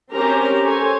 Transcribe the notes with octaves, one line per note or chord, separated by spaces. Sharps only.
C4 C#4 G4 A#4 A#5
A4 C5 C#5 G#5